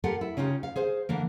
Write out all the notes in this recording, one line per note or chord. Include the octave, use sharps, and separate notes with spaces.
F4 G4 A4 A#4 F#5
E4
C#3 C#4 D#4 F4 G4
F5
G#4 C5 F5
D3 E3 A#3